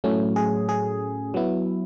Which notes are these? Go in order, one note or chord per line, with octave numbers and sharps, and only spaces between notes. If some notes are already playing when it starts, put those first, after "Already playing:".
A2 F#3 A3 C#4
G#4
G#4
F#3 B3 E4